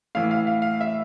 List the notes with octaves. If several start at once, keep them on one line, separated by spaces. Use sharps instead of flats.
A2 E3 F5
F5
F5
F5
E5